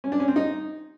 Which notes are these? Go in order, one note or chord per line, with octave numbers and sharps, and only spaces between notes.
C#4
D4
C#4
C4
D#4